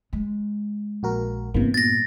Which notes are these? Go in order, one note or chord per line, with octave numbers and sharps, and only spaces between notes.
G#3
A#1 F#4 A#4
G2 C3 E3 A#3 B3
A#2 A6 A#6